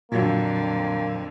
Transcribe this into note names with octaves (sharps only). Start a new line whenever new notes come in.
F2 A#2 D3 F#3 A#3